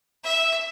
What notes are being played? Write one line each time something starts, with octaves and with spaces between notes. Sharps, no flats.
E5